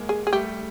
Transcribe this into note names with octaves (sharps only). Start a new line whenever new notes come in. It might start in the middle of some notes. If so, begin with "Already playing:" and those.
Already playing: G#3 A#3
G#4
G#4
G3 A3 G4